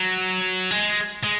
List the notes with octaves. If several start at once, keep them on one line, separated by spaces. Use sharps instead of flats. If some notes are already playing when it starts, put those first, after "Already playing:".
Already playing: F#3
G#3
G#3